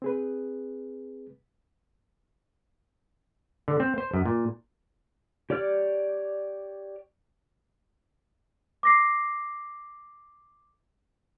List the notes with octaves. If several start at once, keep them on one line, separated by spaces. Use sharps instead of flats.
C4 G#4 B4
D3
C4
C5
F#2
A#2
G4 C#5 D5 F6
D6 A#6 C7